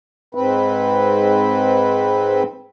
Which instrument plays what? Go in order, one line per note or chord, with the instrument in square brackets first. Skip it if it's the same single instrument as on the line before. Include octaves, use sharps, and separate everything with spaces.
[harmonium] G#2 C4 B4